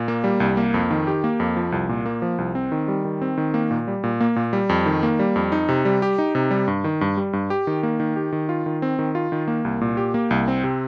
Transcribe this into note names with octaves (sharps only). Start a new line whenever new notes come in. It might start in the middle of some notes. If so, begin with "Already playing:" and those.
Already playing: A#2
A#3
G3
C2
A#3
F2
D#3
G4
A#3
F2
F3
C2
A#2
A#3
F3
C2
C4
D#3
G3
D#3
C4
D#3
A#3
A#2
G3
A#2
A#3
A#2
G3
F2
D#3
A#3
G3
F2
D#4
C3
G3
G4
D#4
C3
G3
G2
D#3
G2
G3
G2
G4
D#3
A#3
D#3
G4
D#3
F4
D#3
C4
D#3
F4
D#3
A#3
C2
A#2
G4
A#3
C2
C4
C3